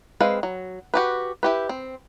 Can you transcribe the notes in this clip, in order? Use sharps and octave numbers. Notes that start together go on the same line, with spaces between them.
G#3 C4 B4 F5
F#3
F#4 G4 B4
E4 G4 B4
C4